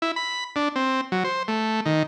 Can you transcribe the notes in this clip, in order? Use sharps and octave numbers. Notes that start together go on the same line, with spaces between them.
E4
B5
D4
C4
F#3
C5
A3
D#3